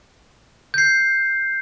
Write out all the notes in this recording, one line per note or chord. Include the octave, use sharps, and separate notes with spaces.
G6 C7